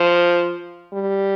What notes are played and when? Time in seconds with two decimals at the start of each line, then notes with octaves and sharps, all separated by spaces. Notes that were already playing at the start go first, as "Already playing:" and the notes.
Already playing: F3
0.93 G3